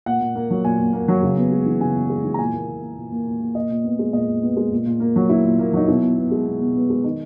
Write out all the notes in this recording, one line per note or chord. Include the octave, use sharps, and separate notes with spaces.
A#2 F#5
A#2
A#3
F#3
A#2 G#5
A#2
A#3
F#3
C#3
B3
G#3
E3
C#3 G#5
B3
G#3
E3
A#5
A#2 G#5
A#3
A#2
A#3
A#2
A#3
A#2
A#3
A#2 D#5
A#2
B3
G#3
A#2 D#5
A#2
B3
G#3
A#2
A#2
A#3
F#3
A#2 E4
A#2
A#3
F#3 D#4
B2 E4
B2
B3
G#3
B2
B2
B3
G#3
D#3 D#4